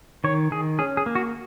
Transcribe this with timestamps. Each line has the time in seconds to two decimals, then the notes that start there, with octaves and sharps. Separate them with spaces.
0.24 D#3 C#5
0.51 D#3 G#4
0.79 C#4 G#4
0.97 G#4
1.06 A#3
1.15 F#4